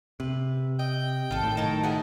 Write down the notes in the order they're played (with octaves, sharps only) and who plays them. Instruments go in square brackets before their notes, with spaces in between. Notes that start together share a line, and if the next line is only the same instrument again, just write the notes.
[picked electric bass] C3 [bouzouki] B4
[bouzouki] D#5 [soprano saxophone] G5
[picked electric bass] G#1 [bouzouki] F4 A4
[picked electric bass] A2 D#3
[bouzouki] F#3 A#4 A5 [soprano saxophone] D#4
[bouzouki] F3 G#4 E5 [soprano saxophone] F#5